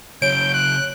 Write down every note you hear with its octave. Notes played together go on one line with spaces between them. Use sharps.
C#3 F#3 C#5 G6 D7
F#6